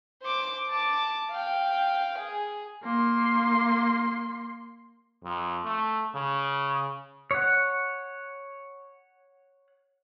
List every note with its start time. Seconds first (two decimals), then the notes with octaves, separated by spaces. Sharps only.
0.22 C5 D6
0.69 A5 D6
1.31 F5 G5
2.18 G#4
2.83 A#3 C6
5.23 F2
5.65 A3
6.15 C#3
7.31 C#5 F#5